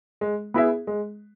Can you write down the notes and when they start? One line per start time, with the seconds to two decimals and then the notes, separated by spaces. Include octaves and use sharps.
0.21 G#3
0.54 B3 E4 G#4 E5
0.87 G#3